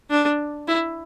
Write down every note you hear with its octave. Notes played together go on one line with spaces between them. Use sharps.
D4
E4